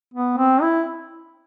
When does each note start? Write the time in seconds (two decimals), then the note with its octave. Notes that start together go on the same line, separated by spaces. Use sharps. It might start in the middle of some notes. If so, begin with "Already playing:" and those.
0.14 B3
0.37 C4
0.62 E4